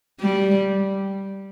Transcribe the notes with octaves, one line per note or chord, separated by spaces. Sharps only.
G3